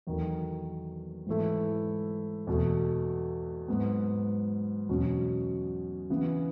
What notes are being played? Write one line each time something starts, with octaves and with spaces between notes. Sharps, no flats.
E2 D#3 F#3 A3
G#2 E3 A3 E4
E2 B2 A3
G#2 F#3 B3
E2 B2 F#3 C#4
C#3 E3 B3